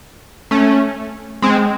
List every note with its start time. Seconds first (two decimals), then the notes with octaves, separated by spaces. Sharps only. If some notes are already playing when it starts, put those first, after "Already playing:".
0.51 A3 C#4
1.42 G#3 C4